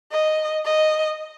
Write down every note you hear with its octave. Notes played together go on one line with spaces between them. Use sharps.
D#5
D#5